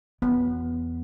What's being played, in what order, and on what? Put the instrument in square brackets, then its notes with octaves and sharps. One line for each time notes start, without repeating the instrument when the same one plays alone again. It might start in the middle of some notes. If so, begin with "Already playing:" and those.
[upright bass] E2 [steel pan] B3